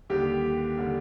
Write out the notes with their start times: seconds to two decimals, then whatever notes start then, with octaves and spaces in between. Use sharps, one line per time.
0.10 D#2 D3 G3 G4
0.78 D3 G3